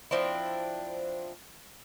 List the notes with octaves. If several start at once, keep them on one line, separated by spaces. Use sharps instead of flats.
F3 C4 D4 E4